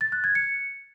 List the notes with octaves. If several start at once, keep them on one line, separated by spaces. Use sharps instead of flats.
A6
F#6
G#6
C#7